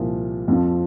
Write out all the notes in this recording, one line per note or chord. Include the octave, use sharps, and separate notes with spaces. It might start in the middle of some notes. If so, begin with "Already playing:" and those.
Already playing: C2 A#2 F3
F2 F3